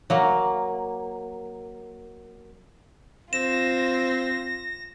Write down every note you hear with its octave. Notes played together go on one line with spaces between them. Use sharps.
F#3 A#3
C4 F4 A#6 E7